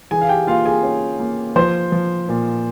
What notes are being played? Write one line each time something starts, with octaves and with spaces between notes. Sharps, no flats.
E3 G#4 G#5
F5
G4 G5
A#3 F4 F5
G#4 G#5
C#4
A#3
F3 C5 C6
F3
A#2